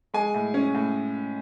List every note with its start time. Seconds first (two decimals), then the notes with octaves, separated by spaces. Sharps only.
0.14 G#3 G#5
0.34 A2
0.54 C#4
0.75 A2